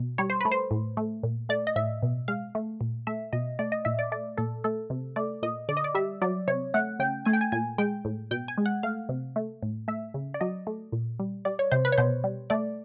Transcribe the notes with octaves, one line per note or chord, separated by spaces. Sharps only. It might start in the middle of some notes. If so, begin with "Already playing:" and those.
Already playing: B2
G3 C#5
C5
A3 B4
C5
A2
A3
A#2
A3 D5
D#5
A2 E5
B2
G#3 F5
A3
A#2
A3 E5
B2 D#5
A3 D5
D#5
A#2 E5
D5
A3 D5
A#2 A4
A3 A4
C3
A3 D5
A#2 D#5
D3 D5
D#5
D5
G3 E5
F#3 D5
C3 C#5
A3 F#5
C#3 G5
A3 G#5
G5
G#5
A#2 G#5
G#3 G5
A2
B2 G5
G#5
G#3
F#5
A3 F5
C3
A3
A2
A3 E5
C#3
D5
F#3 D#5
A3
A#2
G3
G3 D5
C#5
C3 C5
B4
C#5
B2 C5
G3
A3 D5